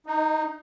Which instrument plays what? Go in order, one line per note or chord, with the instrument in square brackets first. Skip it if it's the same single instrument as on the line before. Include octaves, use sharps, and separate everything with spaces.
[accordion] D#4